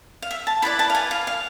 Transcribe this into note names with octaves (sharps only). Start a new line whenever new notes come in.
F5
E5
A5
E4 B4 D5 B5
A5
F5
G#5
F5
F5